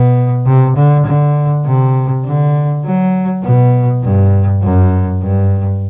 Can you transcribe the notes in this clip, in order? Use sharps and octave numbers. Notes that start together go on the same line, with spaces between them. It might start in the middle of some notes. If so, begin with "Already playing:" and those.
Already playing: B2
C3
D3
D3
C3
D3
F#3
B2
G2
F#2
G2